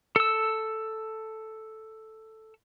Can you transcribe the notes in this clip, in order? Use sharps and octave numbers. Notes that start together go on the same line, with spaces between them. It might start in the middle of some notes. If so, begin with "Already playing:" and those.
A4 E6